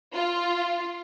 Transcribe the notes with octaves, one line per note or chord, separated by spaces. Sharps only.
F4